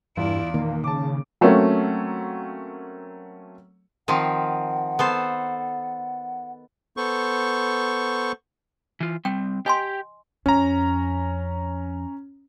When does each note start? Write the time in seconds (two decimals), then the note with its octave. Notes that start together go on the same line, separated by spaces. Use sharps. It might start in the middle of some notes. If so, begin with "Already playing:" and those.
0.17 E2 G2 E4 F4 D5
0.54 A#2 D#3 A#3
0.84 C#3 A5 D6
1.41 F#3 A3 A#3 C4 C#4 F#4
4.08 D#3 F3 C4 F#5
4.99 B3 A4 C5
6.97 B3 A4 C5 C#6
9.01 E3 F4
9.25 G3 C4 G5
9.66 G4 D#5 G5 G#5 C6
10.46 F2 C#4 A#5